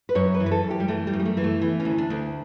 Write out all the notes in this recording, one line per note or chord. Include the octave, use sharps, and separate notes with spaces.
B4
F#2 C#5
B4
E3
B4
A4
F#2
G4
G3
E3 A3
G3
F#2
G3
A3
E3
A3
E3 B3
C#4
D2
D4
D2